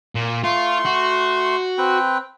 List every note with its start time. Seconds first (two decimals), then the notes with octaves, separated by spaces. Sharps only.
0.15 A#2
0.44 A3 F4 C6 C#6
0.86 F#4
1.78 C4 B4 G5